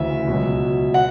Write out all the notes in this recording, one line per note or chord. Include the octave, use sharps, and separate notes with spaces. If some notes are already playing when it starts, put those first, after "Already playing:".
Already playing: D2 C#3 E3 E5
C#2 B2 F#3
F#5